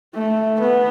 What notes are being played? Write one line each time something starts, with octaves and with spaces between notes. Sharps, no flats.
A3
B3